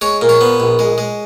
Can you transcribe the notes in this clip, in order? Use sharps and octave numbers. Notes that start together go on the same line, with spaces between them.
G#3 C#5
A#2
C#5
B3
A#1
G#3
G#3